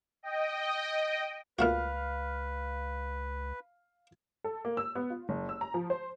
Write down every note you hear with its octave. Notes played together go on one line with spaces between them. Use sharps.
D#5 G5
C#2 A#2 A3 F#4 B4 F5 F6
A4
A#3
E6
B3
F4
F#1
E6
A#5
F3
C5